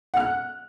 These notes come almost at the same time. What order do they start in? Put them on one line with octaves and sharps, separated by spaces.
F#5 F6 F#6